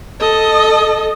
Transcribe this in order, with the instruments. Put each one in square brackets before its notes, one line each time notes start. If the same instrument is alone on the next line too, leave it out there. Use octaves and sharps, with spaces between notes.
[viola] A4 D#5